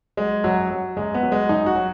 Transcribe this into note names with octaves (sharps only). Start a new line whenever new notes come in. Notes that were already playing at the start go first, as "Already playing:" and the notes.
F#3 G#3
F#2 F#3
F#3
F#2 G#3
B3
F#3
G#3
F#2 D#4
F#4
F#3